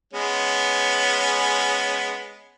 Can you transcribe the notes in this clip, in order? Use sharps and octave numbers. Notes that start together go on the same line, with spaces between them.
G#3 B3 C#4